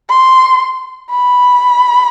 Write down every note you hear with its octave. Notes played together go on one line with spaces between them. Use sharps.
C6
B5